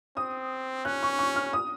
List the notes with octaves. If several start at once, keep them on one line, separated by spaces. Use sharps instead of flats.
C4 D#6
C#4 F#6
C#6
C#6
F6
D#6